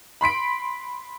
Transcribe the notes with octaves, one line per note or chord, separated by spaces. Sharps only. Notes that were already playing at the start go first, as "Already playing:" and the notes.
B5 C6 B6 D7